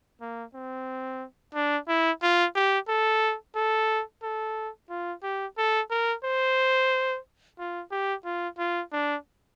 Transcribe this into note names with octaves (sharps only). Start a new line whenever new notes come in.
A#3
C4
D4
E4
F4
G4
A4
A4
A4
F4
G4
A4
A#4
C5
F4
G4
F4
F4
D4